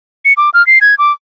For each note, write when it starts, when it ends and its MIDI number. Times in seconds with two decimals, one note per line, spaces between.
0.25 0.33 97
0.37 0.50 86
0.54 0.65 89
0.67 0.79 96
0.81 0.95 92
0.98 1.12 86